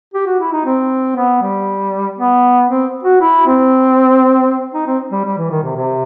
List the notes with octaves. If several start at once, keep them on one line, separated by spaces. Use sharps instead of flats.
G4
F#4
E4
D#4
C4
B3
G3
B3
C4
F#4
E4
C4
D#4
C4
G3
G3
E3
D#3
C3
C3